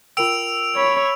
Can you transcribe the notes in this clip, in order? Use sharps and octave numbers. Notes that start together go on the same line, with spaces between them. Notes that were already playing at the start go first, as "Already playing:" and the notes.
F4 A#4 G5 E6 D7 F7
C#5 B5